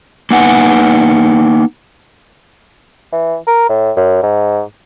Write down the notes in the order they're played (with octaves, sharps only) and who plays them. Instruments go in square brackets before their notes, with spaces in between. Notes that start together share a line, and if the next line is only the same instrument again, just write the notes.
[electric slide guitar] A#3 B3 D#4 B4 F#5 G#5
[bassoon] E3
A#4
A2
F#2
G#2